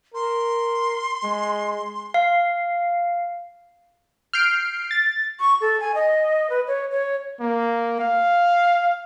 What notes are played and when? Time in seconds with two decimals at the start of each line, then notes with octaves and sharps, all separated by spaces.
0.15 A#4 C6
1.24 G#3
2.14 F5
4.33 F6 G6 C7 D7
4.91 A6
5.40 C#6
5.61 A4
5.80 G#5
5.95 D#5
6.50 B4
6.67 C#5
6.91 C#5
7.40 A#3
8.00 F5